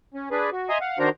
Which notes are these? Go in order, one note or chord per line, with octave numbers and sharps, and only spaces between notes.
C#4
D4 G#4 B4
F#4
D#5 E5 G#5 A#5 C6 D#6
F5 F#5
D#3 D4 F#4 A#4 C5 A#5